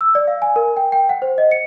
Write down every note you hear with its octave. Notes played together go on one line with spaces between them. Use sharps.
E6
D5
F5
G#5
A#4
G5
G5
F#5
C5
D#5
C#7